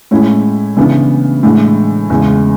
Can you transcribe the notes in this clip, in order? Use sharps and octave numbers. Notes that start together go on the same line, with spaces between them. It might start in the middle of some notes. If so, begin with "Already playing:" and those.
A2 G#3 C#4 E4
C#3 E3 B3 D4
A2 E3 G#3 D4
E2 C#3 G#3